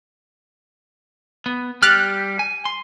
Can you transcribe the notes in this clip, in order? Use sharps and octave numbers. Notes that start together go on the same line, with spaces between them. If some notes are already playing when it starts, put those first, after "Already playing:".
B3
G3 G4 F6 F#6 A6
G#5
C6